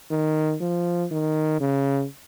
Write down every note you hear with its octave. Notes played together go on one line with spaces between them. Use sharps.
D#3
F3
D#3
C#3